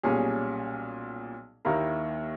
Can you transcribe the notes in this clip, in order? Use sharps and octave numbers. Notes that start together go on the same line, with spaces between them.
B1 A#2 G3 C#4 G#4
D#2 D#3 A#3 E4 A#4